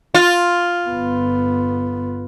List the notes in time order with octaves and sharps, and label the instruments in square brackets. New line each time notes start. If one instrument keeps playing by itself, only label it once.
[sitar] F4
[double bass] G1 B3